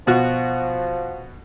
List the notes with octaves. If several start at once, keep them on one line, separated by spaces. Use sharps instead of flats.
B2 F3 F#4